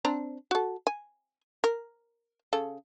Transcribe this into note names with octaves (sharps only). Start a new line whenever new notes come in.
C4 D4 A#5
F#4 A4
G#5
A#4
C#3 A4